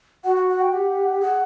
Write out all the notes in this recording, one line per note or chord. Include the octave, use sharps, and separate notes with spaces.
F#4 F#5
F#5
F#5
G5
G4 F#5
G#4 F#5